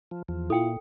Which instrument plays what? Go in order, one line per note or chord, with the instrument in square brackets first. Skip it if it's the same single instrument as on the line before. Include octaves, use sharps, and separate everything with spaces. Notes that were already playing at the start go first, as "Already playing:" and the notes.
[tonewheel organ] F3
E2 F3
[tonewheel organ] A#2 [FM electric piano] E4 F4 [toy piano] A4 G5